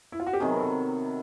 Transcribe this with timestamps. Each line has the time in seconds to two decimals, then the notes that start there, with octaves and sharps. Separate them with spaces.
0.12 E4
0.20 F4
0.26 F#4
0.33 G4
0.40 C3 D#3 F#3 B3 G#4
0.56 A#4
0.60 A4